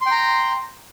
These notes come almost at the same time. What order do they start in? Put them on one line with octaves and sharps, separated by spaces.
C6 G5 A#5